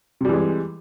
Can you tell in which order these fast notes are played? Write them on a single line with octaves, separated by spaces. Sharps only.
C3 G3 E3 G#3